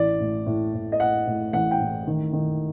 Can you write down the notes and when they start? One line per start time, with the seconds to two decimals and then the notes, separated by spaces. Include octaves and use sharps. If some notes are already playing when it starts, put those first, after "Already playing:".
Already playing: A1 D5
0.20 A2
0.46 A2
0.73 A2
0.92 D#5
1.00 A2 F#5
1.27 A2
1.53 A1 F#5
1.71 G5
1.80 A2
2.07 D#3
2.33 D#3